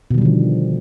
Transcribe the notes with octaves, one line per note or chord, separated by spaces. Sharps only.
B2 D3 D#3 F3 G3